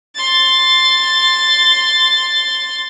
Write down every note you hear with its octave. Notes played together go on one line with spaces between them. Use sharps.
C6 A6